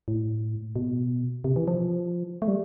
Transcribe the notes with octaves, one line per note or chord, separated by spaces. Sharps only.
A2
B2
C3
E3
F3
A3
G3